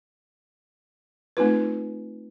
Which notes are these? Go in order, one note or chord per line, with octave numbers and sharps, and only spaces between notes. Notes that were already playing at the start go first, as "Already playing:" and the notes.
A3 C4 D#4 F4 B4